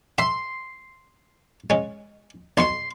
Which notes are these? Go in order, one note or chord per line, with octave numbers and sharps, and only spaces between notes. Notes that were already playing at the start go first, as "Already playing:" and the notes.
E5 C6
G#3 C#4
B1 B2 C6 C#6